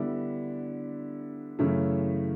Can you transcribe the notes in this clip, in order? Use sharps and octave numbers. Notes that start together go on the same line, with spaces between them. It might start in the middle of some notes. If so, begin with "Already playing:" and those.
Already playing: D3 G3 B3 E4
F#2 C#3 E3 A3 E4